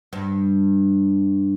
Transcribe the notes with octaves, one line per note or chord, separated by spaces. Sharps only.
G2